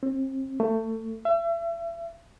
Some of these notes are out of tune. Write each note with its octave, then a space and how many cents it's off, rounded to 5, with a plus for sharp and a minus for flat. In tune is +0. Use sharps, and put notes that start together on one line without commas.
C4 +35
A3 +25
E5 +35